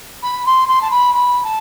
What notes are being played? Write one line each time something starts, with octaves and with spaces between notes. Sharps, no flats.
B5
C6
C6
A5
B5
B5
A5